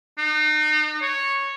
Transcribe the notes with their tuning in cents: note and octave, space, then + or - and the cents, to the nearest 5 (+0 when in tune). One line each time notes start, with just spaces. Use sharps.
D#4 -35
C#5 -5